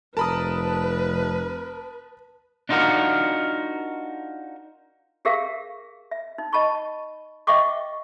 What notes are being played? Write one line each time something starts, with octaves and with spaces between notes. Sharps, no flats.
F1 A#4 B4 A5 B5 D#6
D4 D#4 F4 F#4 A#4
G4 G#4 A#4 E5 F5
E5
D#4
D#5 A5 B5 C#6
D#5 E5 F#5 G5 C#6 D6